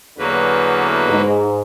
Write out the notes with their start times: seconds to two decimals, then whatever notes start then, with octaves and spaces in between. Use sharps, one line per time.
0.18 E2 D3 F#3 A#3 B4
1.09 G#2